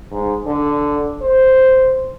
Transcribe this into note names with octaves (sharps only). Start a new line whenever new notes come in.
G#2
D3
C5